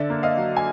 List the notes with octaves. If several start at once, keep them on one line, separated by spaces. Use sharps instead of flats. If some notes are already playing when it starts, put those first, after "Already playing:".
Already playing: D3 D5 E5
A#3
D#5 F5
F#3
G#5